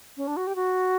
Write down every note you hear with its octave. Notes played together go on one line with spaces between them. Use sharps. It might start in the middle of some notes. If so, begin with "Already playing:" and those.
C#4
D4
F#4
G4
F#4